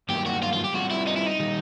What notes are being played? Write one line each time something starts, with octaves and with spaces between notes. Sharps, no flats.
G2 D#3 F#3 A#3 G4
F#4
F4
F4
G4
G3 C4 F4 F#4 G#4
E4
D#4
E4
D#4
D#3 G3